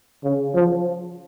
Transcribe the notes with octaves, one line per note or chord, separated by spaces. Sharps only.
C#3
F3